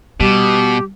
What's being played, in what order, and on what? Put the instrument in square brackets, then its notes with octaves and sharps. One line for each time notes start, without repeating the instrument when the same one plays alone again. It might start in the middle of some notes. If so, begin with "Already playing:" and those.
[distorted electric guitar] B2 [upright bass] G3 [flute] G4